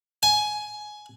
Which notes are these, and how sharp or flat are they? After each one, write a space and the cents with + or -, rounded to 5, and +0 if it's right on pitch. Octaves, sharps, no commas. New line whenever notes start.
G#5 +15